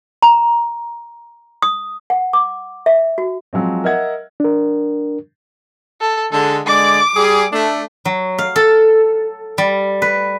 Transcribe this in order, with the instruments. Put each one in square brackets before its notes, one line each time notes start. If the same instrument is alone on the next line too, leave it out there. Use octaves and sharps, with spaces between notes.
[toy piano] A#5
D#6
F#5
D6
E5
F#4
[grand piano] F3 F#3 G#3 C4
A#4 D#5 E5 F#5 G#6
[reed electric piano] D4 A#4
[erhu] A4
[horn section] D3 G#3 [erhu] A4
[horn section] D3 G#3 D5 [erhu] D6
[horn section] G3 G#4
A3 D4
[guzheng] F#3
F5
A4
G3
B4